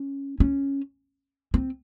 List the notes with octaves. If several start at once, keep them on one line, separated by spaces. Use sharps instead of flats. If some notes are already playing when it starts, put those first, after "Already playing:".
Already playing: C#4
C#4
C4